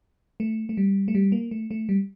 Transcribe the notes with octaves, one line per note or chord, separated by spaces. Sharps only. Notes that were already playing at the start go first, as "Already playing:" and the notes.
A3
A3
G3
A3
G3
A#3
A3
A3
G3